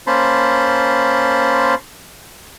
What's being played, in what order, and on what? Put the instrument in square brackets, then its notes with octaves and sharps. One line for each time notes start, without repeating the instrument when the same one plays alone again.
[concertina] A#3 C#4 C5 A5 B5 C6